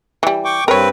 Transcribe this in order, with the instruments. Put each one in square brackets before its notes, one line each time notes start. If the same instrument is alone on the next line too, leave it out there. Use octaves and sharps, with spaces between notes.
[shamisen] E3 G3
[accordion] G5 C#6 D6
[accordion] G2 C4 B4 [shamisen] A#4 C#5